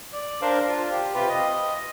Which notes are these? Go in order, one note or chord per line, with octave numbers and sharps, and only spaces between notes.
D5
D4 A#4 C5 F5
F4
G4
C3 F4 G4 B4
D#5